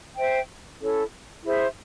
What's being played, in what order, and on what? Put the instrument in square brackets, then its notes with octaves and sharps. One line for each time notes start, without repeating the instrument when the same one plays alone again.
[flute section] C5 E5 G5
C#4 E4 A4 C#5
E4 G#4 C5 E5